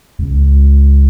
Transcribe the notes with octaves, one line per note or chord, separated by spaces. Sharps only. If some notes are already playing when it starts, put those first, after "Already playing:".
C#2